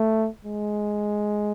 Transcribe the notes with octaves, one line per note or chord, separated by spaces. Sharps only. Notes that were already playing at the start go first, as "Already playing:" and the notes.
Already playing: A3
G#3